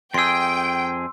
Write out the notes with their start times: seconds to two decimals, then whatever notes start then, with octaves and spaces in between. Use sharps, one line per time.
0.14 F2 G#4 G5 C6 E6